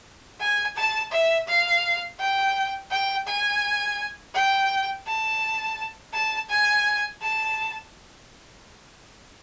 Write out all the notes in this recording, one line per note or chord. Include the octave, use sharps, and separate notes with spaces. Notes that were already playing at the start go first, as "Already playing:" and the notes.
G#5
A5
E5
F5
G5
G5
G#5
G5
A5
A5
G#5
A5